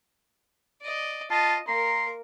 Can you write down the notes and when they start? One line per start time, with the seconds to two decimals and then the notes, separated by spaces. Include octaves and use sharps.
0.82 D5 D#5
1.31 F4 D#5 A5
1.68 A#3 A#4 A#5 C6